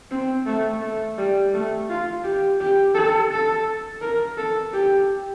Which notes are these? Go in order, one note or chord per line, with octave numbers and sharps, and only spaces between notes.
C4
A3
A3
G3
A3
F4
G4
G4
A4
A4
A#4
A4
G4